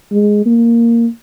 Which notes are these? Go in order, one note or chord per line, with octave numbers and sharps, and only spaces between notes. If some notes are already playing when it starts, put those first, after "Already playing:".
G#3
A#3